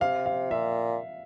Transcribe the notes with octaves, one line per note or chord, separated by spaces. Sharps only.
C3 F5
F5
A#2 E5